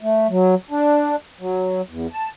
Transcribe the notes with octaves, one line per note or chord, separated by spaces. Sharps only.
A3
F#3
D4
F#3
E2
A5